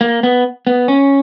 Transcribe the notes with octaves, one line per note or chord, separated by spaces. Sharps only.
A#3
B3
B3
C#4